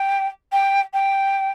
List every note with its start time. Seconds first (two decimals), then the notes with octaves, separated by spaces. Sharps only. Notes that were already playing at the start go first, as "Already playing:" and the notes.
Already playing: G5
0.52 G5
0.94 G5